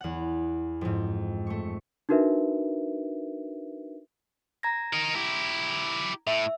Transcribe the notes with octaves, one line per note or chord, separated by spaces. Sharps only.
E2 F#5
F2 G#2
A3 C#6
D4 D#4 F#4 A#4 B4 E5
A#5 G#6 A#6
D#4 A#4
E4 G4
A2 E5